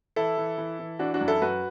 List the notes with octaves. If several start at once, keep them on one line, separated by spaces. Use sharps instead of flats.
E3 E4 A4
E3
E3
E3
E3 D4 F#4
D4 F#4
F#2
E4 A4
F#2 F#4 B4